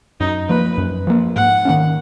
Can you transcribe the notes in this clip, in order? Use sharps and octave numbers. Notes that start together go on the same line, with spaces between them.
F#2 D#4
F3 A#3 B4
F#2
F3 A#3
G#2 F#5
D#3 A#3 C#4